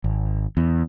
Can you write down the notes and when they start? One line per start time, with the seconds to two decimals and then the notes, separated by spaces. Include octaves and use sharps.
0.04 G#1
0.57 E2